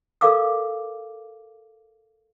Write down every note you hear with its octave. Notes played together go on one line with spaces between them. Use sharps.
A4 A#4 D5 F5 D6 E6